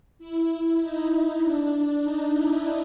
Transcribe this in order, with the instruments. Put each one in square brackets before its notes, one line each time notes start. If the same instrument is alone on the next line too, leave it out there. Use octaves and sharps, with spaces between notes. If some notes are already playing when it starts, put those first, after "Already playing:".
[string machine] E4
D#4
D4
D#4
E4